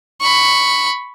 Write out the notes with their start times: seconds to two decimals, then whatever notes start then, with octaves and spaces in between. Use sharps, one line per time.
0.21 B5 C#6